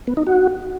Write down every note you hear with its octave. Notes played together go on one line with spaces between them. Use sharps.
B3
D#4
F#4